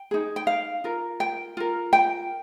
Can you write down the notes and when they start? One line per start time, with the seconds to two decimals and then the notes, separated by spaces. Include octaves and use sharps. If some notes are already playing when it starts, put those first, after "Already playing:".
Already playing: G5
0.11 D#4 G#4
0.36 G5
0.47 F5
0.84 F4 A#4
1.20 G5
1.57 F4 A#4
1.93 G5